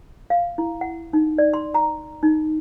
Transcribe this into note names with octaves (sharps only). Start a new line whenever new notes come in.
F5
E4
F#5
D#4
D5
C6
A#5
D#4